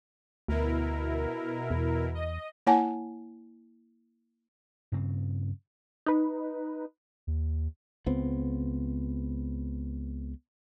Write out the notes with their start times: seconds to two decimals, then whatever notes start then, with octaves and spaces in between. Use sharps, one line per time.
0.48 D2 B2 E4 A#4
1.70 E2
2.15 D#5
2.67 A#3 E4 C#5 F#5 G#5 A5
4.92 G2 C#3 C4
6.06 D#4 B4
7.27 D#2
8.06 C#2 B3 C4